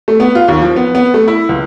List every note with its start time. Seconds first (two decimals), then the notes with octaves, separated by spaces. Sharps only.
0.08 A3
0.20 B3
0.35 F4
0.48 D#2
0.62 F3
0.76 B3
0.95 B3
1.14 A3
1.28 E4
1.49 C#2